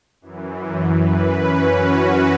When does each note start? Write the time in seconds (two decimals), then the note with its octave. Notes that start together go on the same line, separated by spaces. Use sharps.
0.21 F#2 E3
0.97 B4
1.35 C#4
1.73 F#4